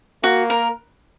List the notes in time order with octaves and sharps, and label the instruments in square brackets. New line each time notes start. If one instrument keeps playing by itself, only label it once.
[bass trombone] A#3 [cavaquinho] F#4
[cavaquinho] A#4